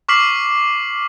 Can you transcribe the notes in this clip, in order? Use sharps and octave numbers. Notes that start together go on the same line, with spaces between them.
C#6 D6 F6 B6 C7 F#7